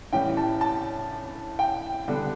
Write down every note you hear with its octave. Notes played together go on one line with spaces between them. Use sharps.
A2 E3 G3 C#4 G5
A5
A5
G5
D3 G3 B3 D4